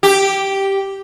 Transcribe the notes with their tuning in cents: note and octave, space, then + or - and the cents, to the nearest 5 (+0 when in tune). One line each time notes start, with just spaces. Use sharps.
G4 -5